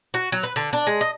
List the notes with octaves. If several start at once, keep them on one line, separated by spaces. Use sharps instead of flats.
F#4
F#3
B4
D3
D4
G#3
D#5